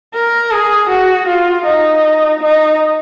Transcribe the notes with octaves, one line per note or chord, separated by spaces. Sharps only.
A#4
G#4
F#4
F4
D#4
D#4